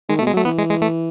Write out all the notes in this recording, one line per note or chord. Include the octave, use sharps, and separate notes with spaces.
D#3 G#3
A3
B2
G#3
F#3 A3
E3 B3
G#3
G#3
A3